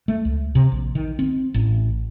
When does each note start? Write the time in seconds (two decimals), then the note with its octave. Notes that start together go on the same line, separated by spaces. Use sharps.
0.08 A3
0.25 C#2
0.55 C3
0.72 A#1
0.95 D#3
1.19 C4
1.54 A1